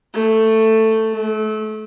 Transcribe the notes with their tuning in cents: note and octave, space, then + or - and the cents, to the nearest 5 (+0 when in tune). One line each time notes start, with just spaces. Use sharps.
A3 +10
A3 -30